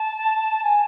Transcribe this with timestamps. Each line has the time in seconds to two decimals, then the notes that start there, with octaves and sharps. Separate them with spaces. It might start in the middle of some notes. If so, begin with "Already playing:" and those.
Already playing: A5
0.63 G#5